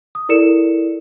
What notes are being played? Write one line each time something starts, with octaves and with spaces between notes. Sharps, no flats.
D#6
E4 A4 A#4 D5 C#7 E7